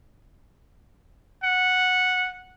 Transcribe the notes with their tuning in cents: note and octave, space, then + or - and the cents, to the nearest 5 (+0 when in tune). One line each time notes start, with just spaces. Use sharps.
F#5 -10